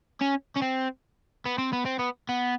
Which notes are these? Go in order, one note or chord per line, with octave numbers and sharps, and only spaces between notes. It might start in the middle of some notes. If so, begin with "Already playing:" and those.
C#4
C#4
C4
B3
C4
B3
C4
B3
B3